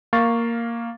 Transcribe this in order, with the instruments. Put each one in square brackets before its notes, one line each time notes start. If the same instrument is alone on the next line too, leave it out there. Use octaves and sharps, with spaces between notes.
[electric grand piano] A#3 F5 C#6 A6